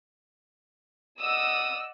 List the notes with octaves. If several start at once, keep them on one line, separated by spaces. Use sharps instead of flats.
D5 D#5 F#5 D#6 E6